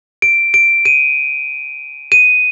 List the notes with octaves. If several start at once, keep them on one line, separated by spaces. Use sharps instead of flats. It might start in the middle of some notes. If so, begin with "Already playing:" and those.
D7
D7
D#7
D#7